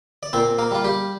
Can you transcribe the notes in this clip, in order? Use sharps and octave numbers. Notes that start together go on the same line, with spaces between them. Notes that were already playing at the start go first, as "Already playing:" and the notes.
D5
A#2 C4 C5
A#3 A#4
G3 F4
G3 G4